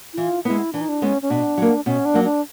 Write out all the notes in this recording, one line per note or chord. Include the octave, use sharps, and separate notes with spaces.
E4
E3 F4
G#3 B3 E4
E3 D4
D#4
D4
G#3 B3 C#4
C#4
B2 D4
F#3 A#3
B2 C#4
D4
F#3 A#3
D4